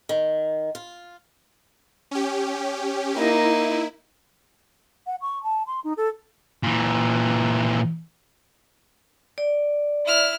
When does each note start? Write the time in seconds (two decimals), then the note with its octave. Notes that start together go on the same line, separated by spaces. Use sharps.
0.09 D#3
0.75 F4
2.11 C#4 G4
3.16 A#3 D#4 E4
5.07 F#5
5.21 C#6
5.44 A5
5.67 C6
5.84 D#4
5.97 A4
6.63 A#2 E3
9.38 D5
10.05 E4 F6